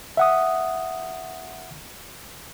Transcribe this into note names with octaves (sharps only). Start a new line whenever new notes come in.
E5 F#5 D#6